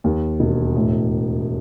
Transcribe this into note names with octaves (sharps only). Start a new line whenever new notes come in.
D#2
E1
A2